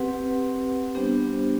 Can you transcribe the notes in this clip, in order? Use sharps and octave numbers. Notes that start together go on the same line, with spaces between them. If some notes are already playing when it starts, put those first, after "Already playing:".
Already playing: C4 G4 B4 F#5
G3 B3 D4 G4 C5